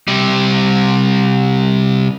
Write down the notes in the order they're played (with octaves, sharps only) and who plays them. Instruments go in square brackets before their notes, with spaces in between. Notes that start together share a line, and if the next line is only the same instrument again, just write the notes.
[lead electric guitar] C3 G3